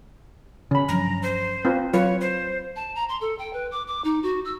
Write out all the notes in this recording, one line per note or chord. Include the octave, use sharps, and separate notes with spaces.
C#3 C#4 B5
G2 F3 F#3 A#5
C5
C4 F4 B4
F#3 F4 B4 C#5
C5
A5
A#5
C6
A4
G5
B4
D6
D6
D#4
F#4
E6